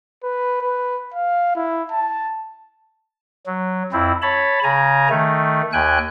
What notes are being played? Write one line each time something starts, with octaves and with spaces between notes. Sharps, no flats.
B4
B4
F5
E4
A5
F#3
F2 C4 E4
C#5 A5 B5
C#3 G#5 A#5
D#3 A3
D#2 G5 G#5 F#6